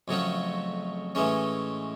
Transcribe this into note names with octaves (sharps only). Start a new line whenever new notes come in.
F2 C#3 F#3 A3 C#4
A2 E3 G#3 C#4